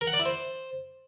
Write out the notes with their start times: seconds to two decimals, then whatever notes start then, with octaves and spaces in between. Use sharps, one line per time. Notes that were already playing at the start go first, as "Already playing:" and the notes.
0.01 A#4
0.07 F#5
0.13 D5
0.19 E4
0.25 C5